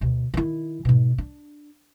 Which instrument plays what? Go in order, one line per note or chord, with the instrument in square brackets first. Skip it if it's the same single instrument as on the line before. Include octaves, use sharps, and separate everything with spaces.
[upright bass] D2 B2
D#3 E4
G#2 B2
D4